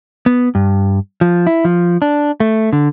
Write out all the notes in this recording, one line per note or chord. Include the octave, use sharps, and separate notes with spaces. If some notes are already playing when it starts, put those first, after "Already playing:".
B3
G2
F3
E4
F3
D4
A3
D3